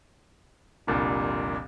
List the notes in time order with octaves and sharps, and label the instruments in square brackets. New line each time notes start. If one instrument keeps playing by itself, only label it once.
[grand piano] F1 C2 A#2 D3